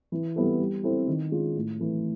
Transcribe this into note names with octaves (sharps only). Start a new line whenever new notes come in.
E3
G3 B3 E4 A4
G3
C4 E4 A4
D#3
G#3 C#4 F4
A2
E3 A3